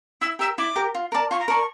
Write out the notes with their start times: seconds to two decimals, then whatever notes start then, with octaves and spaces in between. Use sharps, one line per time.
0.21 E4 E6
0.39 G4 A#4 E6
0.58 E4 D6
0.76 G4 A#4
0.95 F4
1.12 A#4 D5 A5
1.31 F4 C#6
1.39 A#5
1.48 A#4 D5 A5 C#6